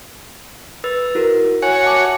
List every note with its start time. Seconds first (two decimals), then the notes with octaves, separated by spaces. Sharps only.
0.84 B4 E6 A6
1.15 E4 F#4 A#4
1.62 F#4 C#5 G#5 G#6
1.84 E5 A5 D6